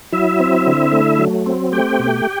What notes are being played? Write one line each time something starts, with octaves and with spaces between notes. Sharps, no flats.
F#3 E4 E5
C4
D3
A3
F#3
C4
A3 G4 G5
B2